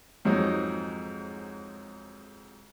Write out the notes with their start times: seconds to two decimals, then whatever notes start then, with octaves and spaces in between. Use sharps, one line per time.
0.25 F2 G#2 F#3 D#4